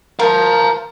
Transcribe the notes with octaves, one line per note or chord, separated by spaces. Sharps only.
A#4 F5 A5